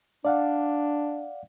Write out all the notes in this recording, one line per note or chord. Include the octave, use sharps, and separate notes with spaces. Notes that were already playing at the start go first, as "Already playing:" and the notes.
D4 D5 F5 F#5